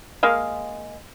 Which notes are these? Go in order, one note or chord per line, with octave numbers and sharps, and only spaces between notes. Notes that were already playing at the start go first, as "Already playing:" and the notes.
G#3 A#3 F5